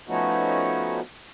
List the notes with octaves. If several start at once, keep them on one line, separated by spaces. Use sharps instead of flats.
F3 A3 B3 C#4 D#4 F#4